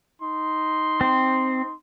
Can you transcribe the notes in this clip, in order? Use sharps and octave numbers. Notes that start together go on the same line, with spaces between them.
D#4 C6
C4